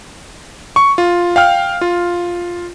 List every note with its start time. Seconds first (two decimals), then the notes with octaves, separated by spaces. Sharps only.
0.76 C#6
0.98 F4
1.36 F5 G5 F6
1.81 F4